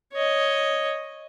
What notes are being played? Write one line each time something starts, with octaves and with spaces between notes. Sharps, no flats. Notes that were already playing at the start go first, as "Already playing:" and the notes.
C#5 D#5